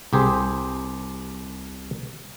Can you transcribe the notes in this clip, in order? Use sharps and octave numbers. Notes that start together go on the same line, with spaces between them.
C2 G4 G#4 C5